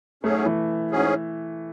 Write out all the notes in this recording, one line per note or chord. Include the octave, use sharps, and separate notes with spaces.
G#2 F#3 A3 C#4 G#4
E3
G#2 F#3 C#4 G#4